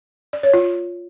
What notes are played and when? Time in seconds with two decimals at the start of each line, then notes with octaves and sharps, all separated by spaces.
0.33 D5
0.43 C#5
0.54 F4